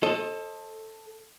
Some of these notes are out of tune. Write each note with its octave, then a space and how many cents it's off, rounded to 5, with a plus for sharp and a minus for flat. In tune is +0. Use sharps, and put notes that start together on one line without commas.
A4 +5 C5 +40 D#5 +0